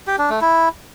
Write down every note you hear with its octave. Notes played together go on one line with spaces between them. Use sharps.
G4
D4
A3
E4